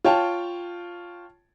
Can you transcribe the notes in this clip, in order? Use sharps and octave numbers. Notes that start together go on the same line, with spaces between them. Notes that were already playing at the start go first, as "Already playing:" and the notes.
F4 C#5 G5 A5